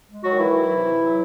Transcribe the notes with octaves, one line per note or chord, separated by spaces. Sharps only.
G#3
F#3 F#4
D#3
E3 E4
F#3
C3
F#3